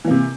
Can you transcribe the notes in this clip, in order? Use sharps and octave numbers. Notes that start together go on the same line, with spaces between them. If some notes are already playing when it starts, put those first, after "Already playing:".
C3 E3 A#3